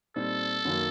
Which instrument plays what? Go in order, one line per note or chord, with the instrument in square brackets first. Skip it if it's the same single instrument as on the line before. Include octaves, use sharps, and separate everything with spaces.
[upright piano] A#2 G3 C4 D#4 [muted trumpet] A4
[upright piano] F#2 D#3 F#3 A#3